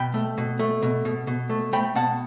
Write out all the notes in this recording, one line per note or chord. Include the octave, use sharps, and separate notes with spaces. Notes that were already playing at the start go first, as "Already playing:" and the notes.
Already playing: B2 G5 B5
A3
B2
A3
B2
B2
B2
A3
A3 G5 B5
B2 F#5 A5